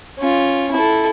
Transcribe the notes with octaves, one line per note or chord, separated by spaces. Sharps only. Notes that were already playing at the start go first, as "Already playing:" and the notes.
C#4 F4
E4 A4